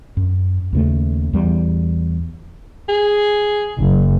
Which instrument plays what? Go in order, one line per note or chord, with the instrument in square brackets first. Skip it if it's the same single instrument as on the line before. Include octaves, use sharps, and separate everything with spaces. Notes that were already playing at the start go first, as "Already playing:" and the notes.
[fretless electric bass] F#2
D#2 C#3 A3
E2 G3
[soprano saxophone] G#4
[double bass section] F#1